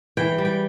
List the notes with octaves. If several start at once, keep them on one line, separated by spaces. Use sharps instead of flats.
E3 G5
G3
G5